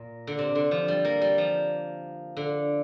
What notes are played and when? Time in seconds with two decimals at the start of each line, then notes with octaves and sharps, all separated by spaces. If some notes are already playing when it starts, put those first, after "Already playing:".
Already playing: A#2
0.27 D3
0.39 C3
0.55 D3
0.71 F3
0.88 G3
1.05 A#3
1.22 G3
1.38 F3
2.37 D3